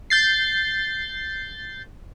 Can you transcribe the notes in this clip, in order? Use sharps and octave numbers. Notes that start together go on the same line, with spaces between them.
G6 A6 C7